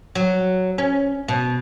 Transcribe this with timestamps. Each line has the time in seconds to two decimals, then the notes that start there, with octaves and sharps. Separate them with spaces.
0.15 F#3
0.78 C#4
1.28 B2